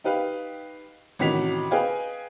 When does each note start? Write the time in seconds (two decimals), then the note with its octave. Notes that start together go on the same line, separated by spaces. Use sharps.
0.04 D#4 G4 B4 F5
1.19 A1 C3 D#3 F#4 B6 F7
1.71 G#4 B4 D#5 F5 G5 G#5